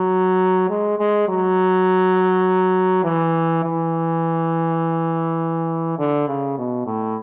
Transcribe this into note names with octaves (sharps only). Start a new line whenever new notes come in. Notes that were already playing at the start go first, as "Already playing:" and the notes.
Already playing: F#3
G#3
G#3
F#3
E3
E3
D3
C#3
B2
A2